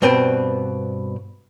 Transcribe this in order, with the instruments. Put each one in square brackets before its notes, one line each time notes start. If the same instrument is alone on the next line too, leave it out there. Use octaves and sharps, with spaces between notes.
[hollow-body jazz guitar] G2 B2 C4 D4 B4 G5